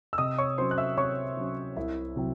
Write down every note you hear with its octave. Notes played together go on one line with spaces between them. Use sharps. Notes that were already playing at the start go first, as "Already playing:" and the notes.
E6
C3 D#5 D#6
C#5 C#6
F#3 C#4 C5 C6
F#6
E5 E6
C3 C#5 C#6
F#3 C#4
C2 E4 E5
C3 F#3 C4